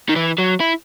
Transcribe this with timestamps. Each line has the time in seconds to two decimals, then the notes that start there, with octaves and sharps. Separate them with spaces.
0.09 D#3
0.16 E3
0.38 F#3
0.60 E4